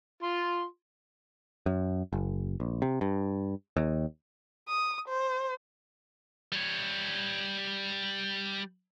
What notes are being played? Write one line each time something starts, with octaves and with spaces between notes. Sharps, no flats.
F4 C6
F#2
F#1
A#1
C3
G2
D#2
D#6
C5
G3 C#5